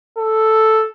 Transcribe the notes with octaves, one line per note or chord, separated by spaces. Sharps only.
A4